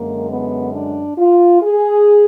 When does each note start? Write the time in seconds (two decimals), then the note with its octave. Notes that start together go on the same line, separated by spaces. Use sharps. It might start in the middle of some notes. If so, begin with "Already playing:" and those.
Already playing: F#2 D3 G#3 A#3
0.29 B3
0.74 D4
1.18 F4
1.63 G#4